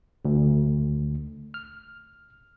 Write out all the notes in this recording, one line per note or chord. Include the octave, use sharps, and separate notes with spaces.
D2
F6